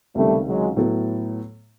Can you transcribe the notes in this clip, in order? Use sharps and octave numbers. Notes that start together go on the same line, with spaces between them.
C#2 C3 D#3 G3 A3
F#3 G#3
A2 F#3 B3 E4 A4